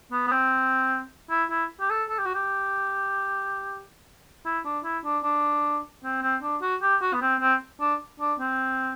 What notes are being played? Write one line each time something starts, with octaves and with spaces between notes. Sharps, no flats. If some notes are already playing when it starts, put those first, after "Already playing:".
B3
B3
C4
E4
E4
G4
A4
A4
G4
F#4
G4
E4
D4
E4
D4
D4
C4
C4
D4
F#4
G4
F#4
B3
C4
C4
D4
D4
C4